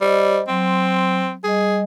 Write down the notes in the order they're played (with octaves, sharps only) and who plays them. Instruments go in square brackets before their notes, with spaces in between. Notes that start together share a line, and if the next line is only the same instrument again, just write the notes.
[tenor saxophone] G3 [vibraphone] C5 D#5
[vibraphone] F#3 C6 [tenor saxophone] C4
[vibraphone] G3 D#5 [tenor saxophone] G#4